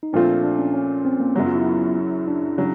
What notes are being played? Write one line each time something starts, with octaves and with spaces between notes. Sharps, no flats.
D#4
A#2 F3 A3 C4 D4 F4
D4
C#4
C#4
C4
A#3
F#2 C#3 F#3 B3
F4
E4
E4
D4
C#3 F#3